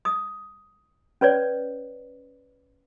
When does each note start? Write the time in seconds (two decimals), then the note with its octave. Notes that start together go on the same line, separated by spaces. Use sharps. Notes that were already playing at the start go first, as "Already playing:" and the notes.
0.05 D#6
1.21 C#4 B4 C#5 D5